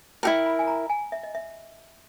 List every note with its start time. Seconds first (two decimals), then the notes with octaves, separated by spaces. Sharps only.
0.23 E4 G4 A#4 G5
0.46 B5
0.59 G#5
0.67 A#5
0.90 G#5
1.12 E5
1.23 D#5
1.35 E5